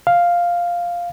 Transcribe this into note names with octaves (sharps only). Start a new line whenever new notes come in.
F5